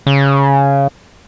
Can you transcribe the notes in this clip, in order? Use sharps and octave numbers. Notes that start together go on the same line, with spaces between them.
C#3